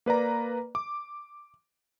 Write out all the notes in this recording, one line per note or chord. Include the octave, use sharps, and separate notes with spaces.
A#3 B4 D5 A#5
D6